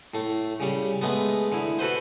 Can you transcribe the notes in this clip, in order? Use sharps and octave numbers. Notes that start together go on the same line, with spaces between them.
A2 A3
C#3 G3
G#3 A3 B3
D3 E4
F#4 A4 B4 C5